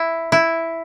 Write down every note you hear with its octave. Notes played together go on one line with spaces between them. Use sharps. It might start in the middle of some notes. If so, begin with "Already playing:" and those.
Already playing: E4
E4